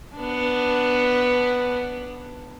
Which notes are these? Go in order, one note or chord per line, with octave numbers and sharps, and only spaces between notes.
B3 D4